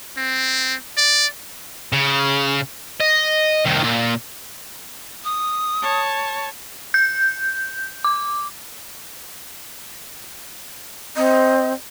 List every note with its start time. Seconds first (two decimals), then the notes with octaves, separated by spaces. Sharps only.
0.17 C4
0.97 D5
1.93 C#3
3.01 D#5
3.65 C2 D#3
3.84 A#2
5.24 D#6
5.82 C#5 A5
6.94 G6
8.04 D6
11.16 C4 D#5